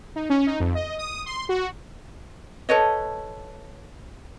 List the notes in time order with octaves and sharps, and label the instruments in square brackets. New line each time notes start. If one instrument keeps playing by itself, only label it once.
[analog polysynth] D#4
C#4
D#4
F2
D#5
D#6
C6
F#4
[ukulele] A4 B4 C#5 D#5